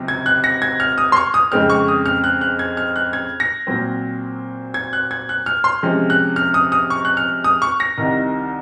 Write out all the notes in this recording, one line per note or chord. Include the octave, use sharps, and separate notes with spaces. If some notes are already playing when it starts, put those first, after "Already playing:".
Already playing: C#2 C3 F#3 C4
G#6
F#6
A#6
G#6
F6
D#6
C6
C#6
D#6
F2 C#3 G#3 C4 F6
C#6
D#6
F6
F#6
F#6
G#6
F6
F#6
G#6
A#6
A#2 F#3 C4
G#6
F#6
G#6
F#6
F6
C6
C3 F3 G#3 C#4
F#6
F6
D#6
D#6
C#6
F#6
F6
D#6
C#6
A#6
C2 C3 D#3